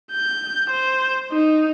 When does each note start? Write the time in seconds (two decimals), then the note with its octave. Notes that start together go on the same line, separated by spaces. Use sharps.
0.13 G6
0.71 C5
1.32 D#4